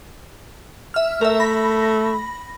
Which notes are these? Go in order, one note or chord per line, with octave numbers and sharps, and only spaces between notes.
E5 F6
A3 A#4 E5
B5 A#6